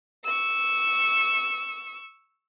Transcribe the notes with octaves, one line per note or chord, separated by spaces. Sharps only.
C#6 E6